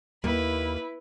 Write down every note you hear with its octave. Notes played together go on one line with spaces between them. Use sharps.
D#2 A#3 E4 B4